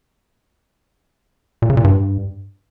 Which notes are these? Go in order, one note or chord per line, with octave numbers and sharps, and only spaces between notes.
A#2
C#3
A#2
G2